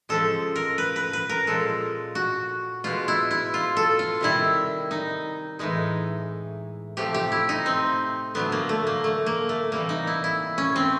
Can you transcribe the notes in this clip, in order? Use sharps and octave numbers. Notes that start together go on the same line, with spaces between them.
C#3 F3 G#3 A4
A#4
B4
B4
B4
A#4
A#2 F3 G#3 A4
F#4
B2 G#3 F4
E4
E4
F4
A4
F4
C3 D#3 G3 E4
D#4
A2 E3 G#3 D#4
C3 F3 A3 G4
G4
E4
D#4
C4
D3 F#3 A3 B3
A#3
A3
A#3
A3
A#3
A3
C3 E3 G3 A#3
D#4
E4
E4
C#4
C4